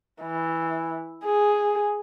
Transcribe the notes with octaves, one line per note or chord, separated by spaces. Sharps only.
E3
G#4